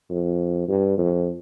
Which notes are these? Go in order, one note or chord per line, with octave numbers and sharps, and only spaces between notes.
F2
G2
F2